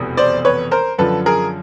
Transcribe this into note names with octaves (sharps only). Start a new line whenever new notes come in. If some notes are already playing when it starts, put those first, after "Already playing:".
Already playing: F1 E2 B2 G3
C5 D5
B4 C#5
A#4 C5
F#2 D3 F3 A4 B4
G#4 A#4